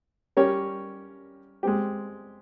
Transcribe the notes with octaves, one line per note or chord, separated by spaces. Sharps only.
G3 C#4 G4 A#4 C#5
G#3 C4 G4